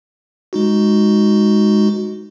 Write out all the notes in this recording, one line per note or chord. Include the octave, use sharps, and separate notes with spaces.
G#3 D#4 F#4